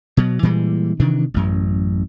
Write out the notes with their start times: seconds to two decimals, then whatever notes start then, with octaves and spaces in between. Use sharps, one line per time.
0.17 B2 F#3
0.43 A#2 E3 G3 G#3
1.00 C3 D#3 E3 D4
1.34 A1 F#2